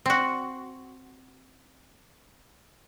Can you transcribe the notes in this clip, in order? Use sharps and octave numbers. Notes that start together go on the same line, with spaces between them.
C4 F#4